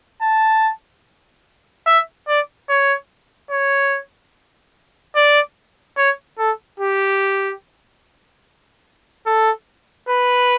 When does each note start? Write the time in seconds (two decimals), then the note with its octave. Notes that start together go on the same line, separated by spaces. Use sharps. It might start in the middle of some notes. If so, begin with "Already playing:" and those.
0.22 A5
1.86 E5
2.28 D5
2.69 C#5
3.51 C#5
5.15 D5
5.97 C#5
6.39 A4
6.80 G4
9.26 A4
10.09 B4